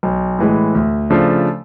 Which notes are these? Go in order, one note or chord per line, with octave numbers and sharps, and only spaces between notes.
B1
A2 E3 G#3
D2
C#3 F3 A3 D4